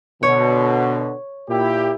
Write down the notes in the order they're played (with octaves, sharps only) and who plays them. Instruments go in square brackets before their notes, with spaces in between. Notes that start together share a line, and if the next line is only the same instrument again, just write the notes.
[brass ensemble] B2 D3 [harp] C#5
[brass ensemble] A#2 E4 G4